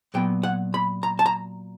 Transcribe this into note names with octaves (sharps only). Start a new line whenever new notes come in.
A#2 F#3 B3 G5
F#5
B5
A#5
A5
A#5